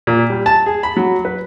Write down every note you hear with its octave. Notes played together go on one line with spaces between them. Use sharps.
A#2
G3
A5
G#4
B5
F#3
B4